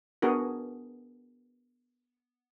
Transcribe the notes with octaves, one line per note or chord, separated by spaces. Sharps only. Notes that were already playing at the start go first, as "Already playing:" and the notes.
B3 D4 F#4 G#4 A#4